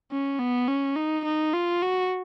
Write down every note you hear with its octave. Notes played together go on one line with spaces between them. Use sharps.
C#4
B3
C#4
D#4
D#4
F4
F#4